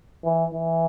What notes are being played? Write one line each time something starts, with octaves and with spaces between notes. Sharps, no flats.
E3
E3